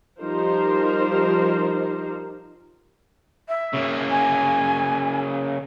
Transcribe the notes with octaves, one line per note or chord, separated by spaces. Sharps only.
F3 G3 D#4 G4 A#4 C5
E5
C#3 A#3
G#5